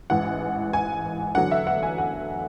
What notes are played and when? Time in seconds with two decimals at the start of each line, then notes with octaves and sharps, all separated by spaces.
0.10 A1 G#2 E3 F#5
0.73 G#5
1.35 E2 D3 F#3 A3 D4 F#5
1.51 E5
1.67 F#5
1.83 G#5
1.98 F#5